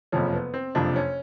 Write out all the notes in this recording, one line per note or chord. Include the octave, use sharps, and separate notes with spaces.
F#1 F2 C3 F3 C#4
B3
C4
F#1 F2 C3 F3 D4
C#4